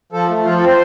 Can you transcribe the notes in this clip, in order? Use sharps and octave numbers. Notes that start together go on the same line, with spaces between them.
F3 A4
A3
F3 F4
A4
C4
C5